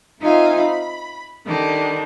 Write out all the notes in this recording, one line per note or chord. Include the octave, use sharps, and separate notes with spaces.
C4 D#4 F4 E5 F5 G#5
B5
D3 D#3 G3 D4